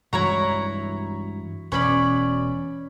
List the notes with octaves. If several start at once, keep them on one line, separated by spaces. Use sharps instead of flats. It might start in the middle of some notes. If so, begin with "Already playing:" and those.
G2 E3 G#3 E4 F#4 C#5 A#5
E1 C#4 B4 C5 D5 B5